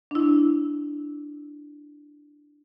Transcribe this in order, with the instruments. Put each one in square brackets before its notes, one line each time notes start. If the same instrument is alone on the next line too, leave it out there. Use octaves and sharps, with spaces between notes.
[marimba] D4 E4